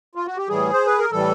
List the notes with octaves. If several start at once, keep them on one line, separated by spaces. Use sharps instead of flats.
F4
F#4
G4
A2 E3 G3 G#4
C5
B4
A#4
A2 E3 G3 A4